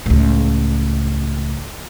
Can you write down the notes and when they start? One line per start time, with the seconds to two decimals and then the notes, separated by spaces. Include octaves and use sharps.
0.06 C#2 A2